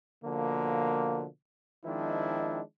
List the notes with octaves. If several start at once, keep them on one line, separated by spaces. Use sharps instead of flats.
B2 D3 F3 A#3
D#3 F3 G#3 C4 D4 E4